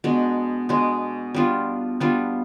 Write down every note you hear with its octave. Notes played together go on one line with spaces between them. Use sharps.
B2 G#3 D4
B2 G#3 D4
G3 B3 D4 F4
G3 B3 D4 F4